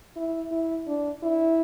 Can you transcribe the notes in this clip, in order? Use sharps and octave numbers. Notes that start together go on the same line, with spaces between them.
E4
E4
D4
E4